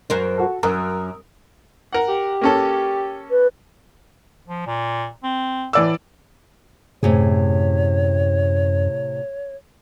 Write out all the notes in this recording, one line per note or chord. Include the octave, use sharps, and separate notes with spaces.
F#2 A#4 C5
F#4 A4
F#2 A#4 D#6 E6
A#4 F#5
G4
A#3 C#4 A4
B4
F3
A#2
C4
A2 E3 D5 E6
F#2 A2 C3 G#4 C#5